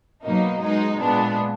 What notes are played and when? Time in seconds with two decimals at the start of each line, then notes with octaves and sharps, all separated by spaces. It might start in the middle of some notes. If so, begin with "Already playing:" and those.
0.23 B2 F#3 A#3 D#4
0.60 B2 G#3 D#4
0.98 A#2 G#3 B3 D4